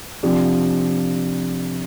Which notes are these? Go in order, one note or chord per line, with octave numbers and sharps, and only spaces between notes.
C3 F3 D4 G4